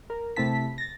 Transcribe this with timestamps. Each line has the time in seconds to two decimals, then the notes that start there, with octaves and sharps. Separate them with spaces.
0.10 A#4
0.36 C3 A3 C4 E4 A5 B6
0.78 A6 A#6